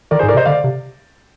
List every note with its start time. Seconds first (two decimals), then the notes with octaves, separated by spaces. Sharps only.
0.11 D#3 A#4 D5
0.19 G#4 C5
0.23 G#2
0.28 A#4 D5
0.34 C3
0.37 C5 D#5
0.46 D3 D5 F5
0.64 C3